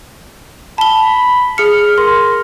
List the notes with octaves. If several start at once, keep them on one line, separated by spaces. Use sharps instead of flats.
A5 B5 G7
G#4 F6 C#7
A#4 C6